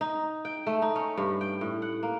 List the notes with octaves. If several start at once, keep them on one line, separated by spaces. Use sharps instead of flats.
D#4
G5
A3
D#4
C#4
G2
G5
A2
F#5
A#3